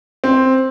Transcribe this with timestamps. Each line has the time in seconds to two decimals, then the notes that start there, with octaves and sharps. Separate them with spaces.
0.24 C4